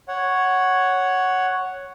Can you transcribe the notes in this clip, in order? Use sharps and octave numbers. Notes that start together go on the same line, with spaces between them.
C#5 F#5